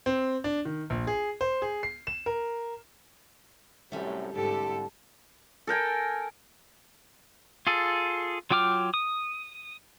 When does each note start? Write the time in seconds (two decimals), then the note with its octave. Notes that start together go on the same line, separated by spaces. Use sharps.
0.06 C4
0.44 D4
0.65 D#3
0.90 A#1
1.07 G#4
1.41 C5
1.62 G#4
1.83 C7
2.07 E7
2.26 A#4
3.92 F#2 A2 C3 G3 A3
4.33 C2 G#2 D3 G4 A4 A5
5.67 A4 A#4 G5 G#5
7.67 F4 G#4 A4
8.51 F#3 F4 G5 D6 F6
8.94 D#6